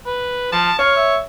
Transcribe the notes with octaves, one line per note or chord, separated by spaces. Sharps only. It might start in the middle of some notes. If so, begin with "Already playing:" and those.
B4
F3 A5
C#5 F5
E5